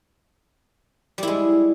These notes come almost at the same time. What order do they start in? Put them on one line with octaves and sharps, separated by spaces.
G3 E4 G#3